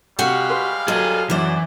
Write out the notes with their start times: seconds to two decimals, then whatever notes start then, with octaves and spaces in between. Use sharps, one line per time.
0.19 C3 G3 G#3 F#4 G4 F5 F#5
0.49 B4 C6
0.88 F#3 G#4 A4 D#5
1.30 F#2 E3 C5 D5